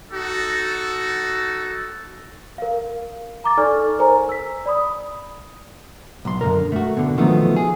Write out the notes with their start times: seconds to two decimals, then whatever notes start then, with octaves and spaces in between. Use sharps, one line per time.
0.12 D#4 F#4 A4
2.58 A#4 F5
3.44 A#5 D6 A6
3.57 D#4 A4 D5 G#5 C#6 F6
3.99 A#4 C5 G#5 A#5
4.29 E6 B6
4.66 D5 B5 D#6
6.25 B1 C6
6.41 F#2 D3 A#4
6.72 A3 F#4
6.97 B2 D3
7.18 D#3 F3 F#3 A3 B3
7.56 G#4